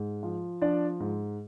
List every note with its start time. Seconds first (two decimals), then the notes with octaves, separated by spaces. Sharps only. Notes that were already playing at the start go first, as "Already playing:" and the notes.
Already playing: G#2
0.23 F3
0.62 F3 D4 D5
1.00 G#2